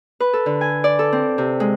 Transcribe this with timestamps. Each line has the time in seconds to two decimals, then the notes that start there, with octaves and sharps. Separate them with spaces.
0.20 B4
0.33 A4
0.46 D3
0.61 G#5
0.84 D5
0.99 A4
1.13 C4
1.38 C3
1.60 G#3